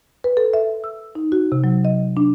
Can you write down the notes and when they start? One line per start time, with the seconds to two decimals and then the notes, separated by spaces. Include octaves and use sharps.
0.24 B4
0.37 A4
0.54 E5
0.84 E6
1.15 D#4
1.32 F#4
1.52 C3
1.64 F#3
1.85 D#5
2.17 D4